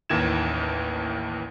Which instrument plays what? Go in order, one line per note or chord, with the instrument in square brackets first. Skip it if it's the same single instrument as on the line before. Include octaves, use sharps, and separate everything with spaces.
[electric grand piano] A1 D#2 D#3 E3 G#6 E7